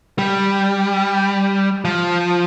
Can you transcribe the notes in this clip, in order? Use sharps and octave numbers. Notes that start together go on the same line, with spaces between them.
G3
F3